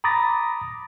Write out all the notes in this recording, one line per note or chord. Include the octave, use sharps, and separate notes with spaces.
A#5 B5 D6 D#6 A6 A#6